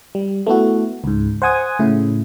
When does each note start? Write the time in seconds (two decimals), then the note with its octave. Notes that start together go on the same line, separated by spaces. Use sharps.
0.15 G3
0.47 A3 B3 E4 F#4
1.04 C#2 G#2
1.42 C5 F#5 G#5 D#6 G#6
1.79 A2 C#3 E4